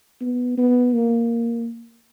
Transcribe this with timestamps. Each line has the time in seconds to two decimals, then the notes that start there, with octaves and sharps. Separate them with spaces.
0.21 B3
0.57 B3
0.94 A#3